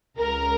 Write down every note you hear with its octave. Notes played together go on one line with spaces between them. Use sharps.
C#2 C#3 A#4